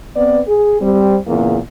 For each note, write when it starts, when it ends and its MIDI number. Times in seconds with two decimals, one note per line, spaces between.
0.16 0.40 59
0.16 0.40 60
0.16 0.40 71
0.16 0.40 74
0.47 0.80 68
0.81 1.17 55
0.81 1.17 60
1.27 1.58 40
1.27 1.58 46
1.27 1.58 49
1.27 1.58 58